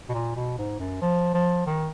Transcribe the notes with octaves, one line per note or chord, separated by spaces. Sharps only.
B2
A#2
B2
G#2
F#2
F3
F3
D#3